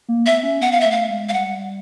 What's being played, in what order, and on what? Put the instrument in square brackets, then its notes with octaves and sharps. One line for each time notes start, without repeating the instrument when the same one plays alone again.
[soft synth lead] A#3
[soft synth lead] B3 [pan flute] E5
[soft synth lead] C#4
[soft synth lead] B3 [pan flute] F#5
[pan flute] F5
E5
[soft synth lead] A3
[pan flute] F5
[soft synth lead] G#3
[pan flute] F5
[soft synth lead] G3 [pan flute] F#5